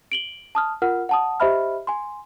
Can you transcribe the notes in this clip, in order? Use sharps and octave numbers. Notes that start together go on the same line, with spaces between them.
D7 F#7 G7
A5 D#6 F6
F4 A#4 F#5 F6
F#5 A5 D#6
G4 C5 D#5 E5 B5 F6
G#5 C6